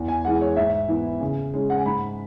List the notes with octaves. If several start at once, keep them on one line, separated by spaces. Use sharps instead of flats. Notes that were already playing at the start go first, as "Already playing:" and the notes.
Already playing: E2
G#5
E3 G#3 F#5
C#5
G#2 E5
E3 B3 E4
C#3
G#3 C#4
F#5
G#5
G#2 B5